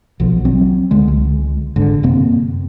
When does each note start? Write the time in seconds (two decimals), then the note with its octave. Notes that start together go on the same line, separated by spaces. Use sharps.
0.20 B1 B2 F3
0.45 F#3 C4
0.91 C#2 D3 G#3
1.08 C#2
1.76 G#1 G#2 D3
2.03 F#2 C3 A#3 C4